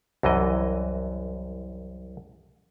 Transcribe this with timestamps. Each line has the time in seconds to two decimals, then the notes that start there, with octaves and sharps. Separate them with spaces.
0.23 C2 F#2 E3 D#5